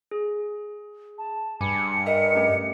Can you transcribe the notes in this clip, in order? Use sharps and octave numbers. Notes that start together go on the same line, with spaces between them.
G#4
A5
G2 G#5 B5 D6 C#7
A#4 D#5 E5 G5
A3 C#4 G4